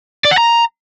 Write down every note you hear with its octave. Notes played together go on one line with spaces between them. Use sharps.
D5
F#5
A#5